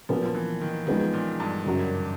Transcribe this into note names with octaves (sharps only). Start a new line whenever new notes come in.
A#2 F3 F#3 B3
F3
E3
D#3
D#3 F3 G#3 B3 D#4 G#4
A#2
G2
F#2 C#3 F#3